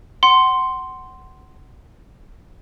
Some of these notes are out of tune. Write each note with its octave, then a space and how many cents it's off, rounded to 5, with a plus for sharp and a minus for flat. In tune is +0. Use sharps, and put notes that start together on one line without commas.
F#5 +25 C6 +0